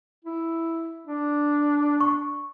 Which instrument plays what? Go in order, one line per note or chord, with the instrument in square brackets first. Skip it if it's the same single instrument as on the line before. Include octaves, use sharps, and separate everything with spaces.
[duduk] E4
D4
[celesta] C#6